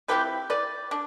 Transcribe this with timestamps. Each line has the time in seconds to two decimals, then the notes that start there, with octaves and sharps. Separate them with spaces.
0.08 F3 C4 E4 G4 B4
0.50 B4 D5
0.91 D4